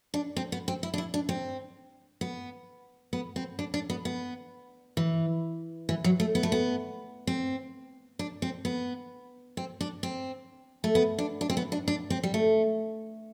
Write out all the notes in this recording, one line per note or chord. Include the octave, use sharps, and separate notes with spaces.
D4
C4
B3
C4
E4
D4
E4
D4
C4
B3
B3
C4
D4
D4
B3
B3
E3
E3
F#3
A3
B3
A3
B3
C4
D4
C4
B3
C4
D4
C4
A3
B3
D4
D4
C4
B3
D4
D4
C4
G3
A3